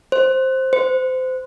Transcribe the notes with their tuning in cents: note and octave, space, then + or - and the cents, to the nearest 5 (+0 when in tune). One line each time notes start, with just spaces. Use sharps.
C5 +10
C5 -25